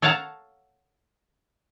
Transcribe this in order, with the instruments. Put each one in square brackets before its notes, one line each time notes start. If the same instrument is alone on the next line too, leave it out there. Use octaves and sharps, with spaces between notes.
[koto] A4 C#5 F5 F#5 A5 A#5